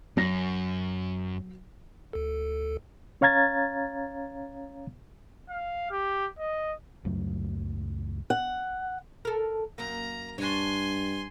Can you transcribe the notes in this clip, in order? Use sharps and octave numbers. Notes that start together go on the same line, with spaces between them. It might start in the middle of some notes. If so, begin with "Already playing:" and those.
F#2 F#3 A#6
D2 A4
C#4 C#5 F5 A#5 G#6 A6
F5
G4
D#5
C#2 F#2 F#3 A3
F#5
A4 A#4
F#2 A#3 A#5
G2 D4 C#5 G#5 C6